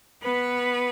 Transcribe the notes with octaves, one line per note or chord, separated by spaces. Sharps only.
B3 B4